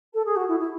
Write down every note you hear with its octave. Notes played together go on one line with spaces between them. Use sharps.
A4
G#4
F#4
E4
E4